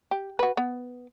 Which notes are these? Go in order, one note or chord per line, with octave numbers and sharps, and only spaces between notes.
G4
F#4 B4
B3